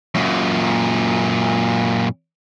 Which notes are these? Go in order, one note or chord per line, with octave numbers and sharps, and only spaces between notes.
F#2 A#2